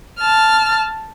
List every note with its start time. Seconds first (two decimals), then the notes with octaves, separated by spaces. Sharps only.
0.20 A5 F6